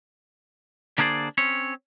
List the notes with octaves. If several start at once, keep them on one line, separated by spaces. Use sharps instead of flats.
D3 A#3 D4 G#4 C5 D5
C4 C#4 C#5